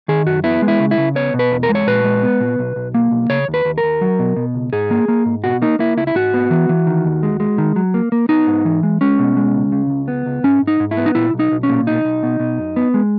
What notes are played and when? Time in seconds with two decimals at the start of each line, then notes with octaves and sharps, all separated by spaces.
0.08 D#3 G#4
0.26 F#2 F#4
0.44 B3 E4
0.62 G#3
0.68 E4
0.80 C#3
0.91 E4
0.98 C#3
1.15 B3 C#5
1.34 B2
1.39 B4
1.52 E2
1.63 A#4
1.69 G#3
1.75 C#5
1.87 A#2 B4
2.04 G#3
2.23 B3
2.40 A#2
2.59 B1
2.76 B1
2.94 A#3
3.11 B1
3.30 C#3 C#5
3.48 D#2
3.54 B4
3.65 D#2
3.78 A#4
3.83 D#2
4.01 F#3
4.19 B2
4.36 B2
4.55 C#2
4.73 G#2 G#4
4.91 A#3
5.08 A#3
5.26 G#2
5.44 B2 F#4
5.62 A#3 D#4
5.79 A#3 E4
5.97 C#2 E4
6.07 E4
6.15 G#2 F#4
6.34 B3
6.50 E3
6.69 E3
6.87 D#3
7.05 D#2
7.23 G#3
7.40 G#3
7.58 D#3
7.76 F#3
7.94 A#3
8.12 A#3
8.29 B3 D#4
8.47 G#2
8.65 E3
8.83 G#3
9.01 G#3 C#4
9.19 B2
9.37 G#3
9.55 C#2
9.72 C#3
9.90 C#2
10.08 B3
10.26 C#2
10.43 G#2 C#4
10.62 G#2
10.67 D#4
10.80 G#2
10.91 E4
10.97 B3
11.06 D#4
11.15 A#2 E4
11.34 B1
11.39 D#4
11.52 B1
11.63 C#4
11.69 A#2
11.87 B1 D#4
12.05 B1
12.23 B2
12.40 B2
12.58 F#2
12.76 B3
12.94 G#3